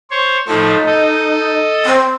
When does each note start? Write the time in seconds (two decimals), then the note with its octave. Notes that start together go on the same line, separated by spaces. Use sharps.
0.11 C5 C#5
0.48 A2 F3 A3 D#4
0.86 A4 D#5
1.85 C4